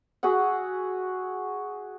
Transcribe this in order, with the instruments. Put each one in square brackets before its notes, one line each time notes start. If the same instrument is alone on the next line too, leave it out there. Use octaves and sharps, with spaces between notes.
[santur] F#4 G#4 E5 F#5